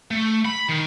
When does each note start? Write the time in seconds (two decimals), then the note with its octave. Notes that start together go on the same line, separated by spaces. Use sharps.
0.11 A3
0.45 B5
0.69 D#3